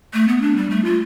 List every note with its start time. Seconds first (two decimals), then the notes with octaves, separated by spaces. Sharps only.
0.13 A3
0.28 B3
0.42 D4
0.56 G3
0.70 A3
0.85 F4